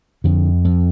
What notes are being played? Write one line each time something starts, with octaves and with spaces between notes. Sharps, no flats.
F2 D3
F2